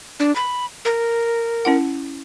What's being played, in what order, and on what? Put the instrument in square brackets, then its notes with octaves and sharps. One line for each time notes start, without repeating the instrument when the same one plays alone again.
[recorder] D4
B5
A#4
[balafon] C#4 E4 F#5